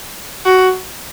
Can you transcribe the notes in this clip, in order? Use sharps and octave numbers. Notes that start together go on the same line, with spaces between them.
F#4